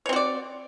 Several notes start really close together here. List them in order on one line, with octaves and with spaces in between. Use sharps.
C#5 C4 F#4 D5